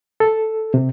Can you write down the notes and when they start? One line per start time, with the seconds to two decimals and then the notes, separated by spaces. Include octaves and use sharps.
0.20 A4
0.74 C3